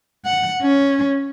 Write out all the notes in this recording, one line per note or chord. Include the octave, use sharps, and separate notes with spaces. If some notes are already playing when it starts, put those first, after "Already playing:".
F#5
C#4